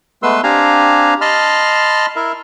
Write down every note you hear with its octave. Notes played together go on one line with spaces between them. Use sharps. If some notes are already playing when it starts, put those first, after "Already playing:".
G#3 A3 B3 B4 C6 E6
C4 D4 G4 F5 G#5 A#5
D#5 A5 B5 C6 F6
E4 A#4 E5